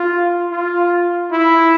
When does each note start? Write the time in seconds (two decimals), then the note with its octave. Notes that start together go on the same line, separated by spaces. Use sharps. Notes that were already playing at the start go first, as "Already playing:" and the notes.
Already playing: F4
0.52 F4
1.31 E4